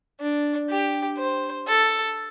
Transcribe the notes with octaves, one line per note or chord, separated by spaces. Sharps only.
D4
G4
C5
A4